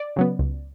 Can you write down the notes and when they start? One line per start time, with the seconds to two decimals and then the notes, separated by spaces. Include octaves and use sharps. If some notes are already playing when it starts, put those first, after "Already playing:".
Already playing: D5
0.16 C#3 F#3 B3
0.39 C#2